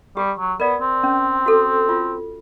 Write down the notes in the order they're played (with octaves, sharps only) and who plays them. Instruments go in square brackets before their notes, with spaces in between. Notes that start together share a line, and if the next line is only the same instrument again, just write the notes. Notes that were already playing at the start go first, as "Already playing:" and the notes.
[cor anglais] G3 [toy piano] G4
[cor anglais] F#3
[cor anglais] B3 [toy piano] A#4 D5
[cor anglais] C4
[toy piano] C#4
F#4 A4
F4